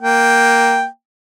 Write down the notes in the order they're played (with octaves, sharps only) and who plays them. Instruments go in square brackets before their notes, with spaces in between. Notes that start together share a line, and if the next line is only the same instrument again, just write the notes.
[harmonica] A#3 G5